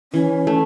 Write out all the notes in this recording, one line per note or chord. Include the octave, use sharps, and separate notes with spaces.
E3 C#4
A3